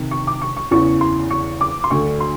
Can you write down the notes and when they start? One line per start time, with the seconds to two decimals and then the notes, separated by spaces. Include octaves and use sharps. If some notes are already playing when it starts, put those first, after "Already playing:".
Already playing: C3 D#3
0.11 C#6
0.27 D6
0.42 C#6
0.57 C#6
0.71 E2 C#3 E3 C#6
1.01 C6
1.30 C#6
1.61 D6
1.84 C6
1.91 D2 D3 C#6
2.20 C6